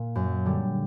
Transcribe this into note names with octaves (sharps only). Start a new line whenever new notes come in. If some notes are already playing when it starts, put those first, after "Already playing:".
Already playing: A#2
F#2
D3 G3